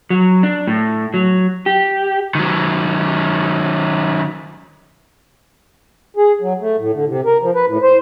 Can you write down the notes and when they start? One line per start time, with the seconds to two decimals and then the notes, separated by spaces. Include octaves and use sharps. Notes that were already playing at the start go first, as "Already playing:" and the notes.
0.10 F#3
0.43 D4
0.67 A2
1.14 F#3
1.66 G4
2.35 D#3 F#3
6.17 G#4
6.41 F#3
6.61 A3
6.79 A2
6.93 D3
7.07 C3
7.25 A#4
7.42 F3
7.55 B4
7.68 A2
7.82 C5